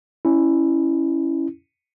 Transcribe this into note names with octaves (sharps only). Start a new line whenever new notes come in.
C#4 E4